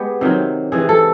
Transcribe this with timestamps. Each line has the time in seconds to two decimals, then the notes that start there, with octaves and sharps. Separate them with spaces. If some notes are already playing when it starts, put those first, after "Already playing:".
Already playing: G#3 B3 G4
0.21 C3 D#3 F#3
0.72 C3 E3 G#3 G#4
0.89 A4